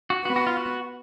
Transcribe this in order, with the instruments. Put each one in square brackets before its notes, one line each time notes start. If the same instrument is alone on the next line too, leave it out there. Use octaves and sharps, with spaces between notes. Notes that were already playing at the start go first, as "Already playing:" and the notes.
[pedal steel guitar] F#4
[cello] B3 [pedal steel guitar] F#4
[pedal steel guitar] F#4
F4
F#4